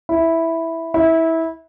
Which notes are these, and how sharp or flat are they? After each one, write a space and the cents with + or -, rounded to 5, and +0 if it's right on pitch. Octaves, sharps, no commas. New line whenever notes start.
E4 -5
E4 -20